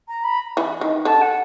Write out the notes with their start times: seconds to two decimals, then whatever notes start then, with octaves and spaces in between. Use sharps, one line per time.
0.08 A#5
0.24 B5
0.57 E3
0.81 D#3
1.05 D3 A5
1.22 F#5